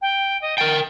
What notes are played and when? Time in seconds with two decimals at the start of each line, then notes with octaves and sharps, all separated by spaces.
0.02 G5
0.42 D#5
0.58 A#4 G5 A6